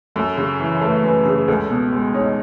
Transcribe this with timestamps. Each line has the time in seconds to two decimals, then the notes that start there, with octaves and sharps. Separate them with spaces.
0.16 F#2 A4
0.37 C#3
0.60 E3
0.81 A3 B4
1.03 F#2 B4
1.25 C#3 G#4
1.48 C#2 A4
1.70 B2
1.92 G#3
2.14 D#4 C#5